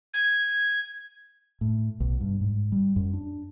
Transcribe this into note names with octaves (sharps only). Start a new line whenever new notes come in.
G#6
A2
B1
G2
G#2
G3
F#2
D4